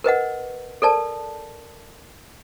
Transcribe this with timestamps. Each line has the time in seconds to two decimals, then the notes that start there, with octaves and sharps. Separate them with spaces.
0.04 A#4 B4 D#5 F#5
0.82 A4 A#4 D5 A5